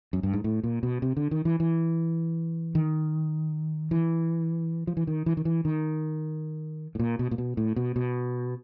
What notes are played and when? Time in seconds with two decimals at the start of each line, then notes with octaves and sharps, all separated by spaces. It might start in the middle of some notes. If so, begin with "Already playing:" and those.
0.13 F#2
0.23 G2
0.33 G#2
0.44 A2
0.63 A#2
0.83 B2
1.02 C3
1.17 D3
1.31 D#3
1.45 E3
1.60 E3
2.75 D#3
3.91 E3
4.87 F3
4.97 E3
5.07 D#3
5.26 E3
5.37 D#3
5.45 E3
5.65 D#3
6.95 A2
6.99 A#2
7.19 B2
7.31 A#2
7.38 B2
7.57 A2
7.76 B2
7.96 B2